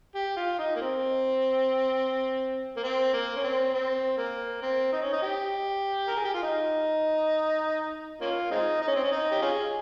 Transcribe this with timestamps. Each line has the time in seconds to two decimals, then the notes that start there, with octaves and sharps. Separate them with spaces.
0.15 G4
0.37 F4
0.59 D#4
0.75 A#3
0.81 C4
2.77 A#3
2.83 C4
3.13 A#3
3.36 C#4
3.44 C4
3.73 C4
4.17 A#3
4.62 C4
4.93 D#4
5.02 C#4
5.13 D#4
5.22 G4
6.08 A#4
6.17 G#4
6.25 G4
6.34 F4
6.42 D#4
8.21 A#3 C#4 F4
8.51 G#3 C4 D#4
8.82 D#4
8.88 C#4
8.95 C4
9.03 C#4
9.12 D#4
9.31 G4
9.42 C#4 F4 G#4